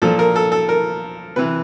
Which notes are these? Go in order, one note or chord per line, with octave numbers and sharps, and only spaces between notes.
A#2 F3 A4
A#4
A4
A4
A#4
C3 E3 B4